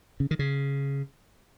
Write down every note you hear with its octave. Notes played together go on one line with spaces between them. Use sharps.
C#3
D#3
C#3